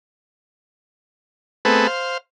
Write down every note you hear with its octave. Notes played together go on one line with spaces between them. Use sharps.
A3 B3 C4 G#4 A4 B4
C5 F5